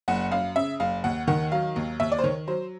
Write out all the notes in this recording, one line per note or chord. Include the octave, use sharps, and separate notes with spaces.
F#1 F#5
F#2 F5
C#3 E5
F#1 F5
D#2 F#5
D#3 F#5
F#3 F5
D#2
D#2 E5
D5
C5
D#3 C#5
F#3 C5